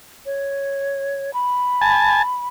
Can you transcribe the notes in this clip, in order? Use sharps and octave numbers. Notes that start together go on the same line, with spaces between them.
C#5
B5
G#5 A5